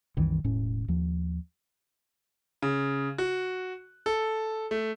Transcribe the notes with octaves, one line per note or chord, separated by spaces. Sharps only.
C2 F#2 D#3 E3
E1 A2 C#4
D#2 F3
C#3
F#4
A4
A3